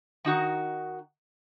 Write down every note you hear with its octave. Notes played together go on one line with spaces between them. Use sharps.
D#3 D#4 F#4